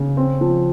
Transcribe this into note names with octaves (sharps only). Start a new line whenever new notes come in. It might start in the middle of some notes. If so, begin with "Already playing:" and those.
Already playing: C#3
C4
F3